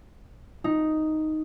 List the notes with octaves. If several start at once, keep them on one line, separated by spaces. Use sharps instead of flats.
D#4